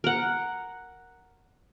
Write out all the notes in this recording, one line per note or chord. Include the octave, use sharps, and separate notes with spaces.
A#4 F#5